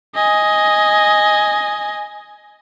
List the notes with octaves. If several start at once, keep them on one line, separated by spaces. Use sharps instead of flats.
D#5 G#5